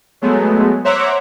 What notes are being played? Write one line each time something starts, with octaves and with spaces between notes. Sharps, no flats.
F#3 G#3 A3 B3
C5 C#5 E5 F#5 A#5 D6